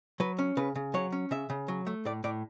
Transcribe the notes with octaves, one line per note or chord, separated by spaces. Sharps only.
F#3 B4
C#4
C#3 B4
C#3
F#3 C#5
C#4
C#3 E5
C#3
F#3
A3
A2 D5
A2 D5